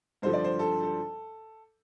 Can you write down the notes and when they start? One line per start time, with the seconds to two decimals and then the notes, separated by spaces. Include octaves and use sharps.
0.22 G2 D3 F3 C5
0.33 D5
0.44 C5
0.59 A4
0.83 A4